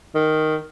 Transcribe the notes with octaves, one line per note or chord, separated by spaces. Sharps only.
D#3